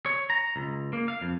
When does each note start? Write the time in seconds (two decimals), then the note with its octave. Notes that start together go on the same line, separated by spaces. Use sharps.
0.06 C#5
0.30 A#5
0.56 C#2
0.93 A#3
1.08 F5
1.22 F2